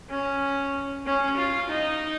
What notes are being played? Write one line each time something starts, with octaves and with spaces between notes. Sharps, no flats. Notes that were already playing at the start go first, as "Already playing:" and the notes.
C#4
C#4
F4
D#4